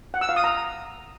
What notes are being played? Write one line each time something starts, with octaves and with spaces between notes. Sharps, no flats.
F#5
E6
F5
D#6
A#5